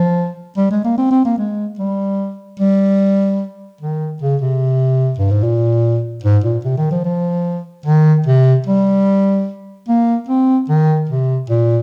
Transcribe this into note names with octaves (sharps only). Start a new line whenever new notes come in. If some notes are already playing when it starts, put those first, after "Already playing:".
Already playing: F3
G3
G#3
A#3
C4
C4
A#3
G#3
G3
G3
D#3
C#3
C3
G2
G#2
A#2
G#2
A#2
C3
D#3
F3
F3
D#3
C3
G3
A#3
C4
D#3
C3
A#2